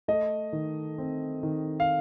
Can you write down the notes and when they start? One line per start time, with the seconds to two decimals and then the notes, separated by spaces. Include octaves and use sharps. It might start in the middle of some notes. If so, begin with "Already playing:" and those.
0.08 A3 D#5
0.53 D#3
0.98 C4
1.43 D#3
1.80 F5